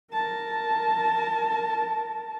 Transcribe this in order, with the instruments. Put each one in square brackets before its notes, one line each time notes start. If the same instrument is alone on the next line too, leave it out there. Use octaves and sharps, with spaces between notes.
[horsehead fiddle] A#4 A5